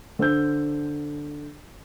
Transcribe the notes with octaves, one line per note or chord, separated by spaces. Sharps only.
D3 C5 E6 G6